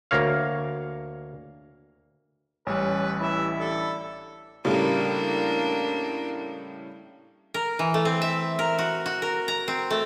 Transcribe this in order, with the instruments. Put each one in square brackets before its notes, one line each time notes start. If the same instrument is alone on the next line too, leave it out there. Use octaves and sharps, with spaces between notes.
[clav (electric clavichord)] D2 A#3 C#5 F5
[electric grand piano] A1 G3 [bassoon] C#4 [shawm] B4
[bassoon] E3 [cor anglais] E4 [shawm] E5
[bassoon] D3 [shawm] A4
[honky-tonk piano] A2 C#3 G3 [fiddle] A#3 D4
[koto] A#4
E3
A3
C4
E5
A#4
F#4
F#4
A#4
A#5
C4
A3